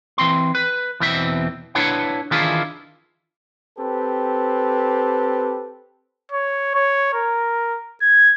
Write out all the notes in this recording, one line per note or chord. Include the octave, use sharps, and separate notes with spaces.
E3 C4 C6
B4
E2 B2 E3 C4 E5
D4 E4 B4 C#5 F#5
D#3 E3 D4 E4 F4 G#4
C4 G4 A4 B4
C#5
C#5
A#4
G#6